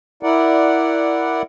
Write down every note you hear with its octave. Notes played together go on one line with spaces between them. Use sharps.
E4 A#4 D5 F#5